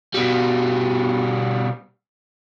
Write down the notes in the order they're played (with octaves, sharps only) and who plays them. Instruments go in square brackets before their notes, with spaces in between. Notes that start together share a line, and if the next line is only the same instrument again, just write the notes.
[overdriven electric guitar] B2 G3